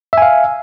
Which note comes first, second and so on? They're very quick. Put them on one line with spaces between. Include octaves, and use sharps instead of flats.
E5 G#5 F5